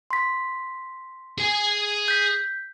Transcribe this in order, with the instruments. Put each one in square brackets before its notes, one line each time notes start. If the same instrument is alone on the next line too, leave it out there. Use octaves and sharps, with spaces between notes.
[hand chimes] C6 B6
[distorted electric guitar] G#4 G#5
[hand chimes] G6 B6